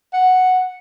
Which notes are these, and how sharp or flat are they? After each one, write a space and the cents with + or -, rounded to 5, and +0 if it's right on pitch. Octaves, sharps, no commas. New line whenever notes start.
F#5 +0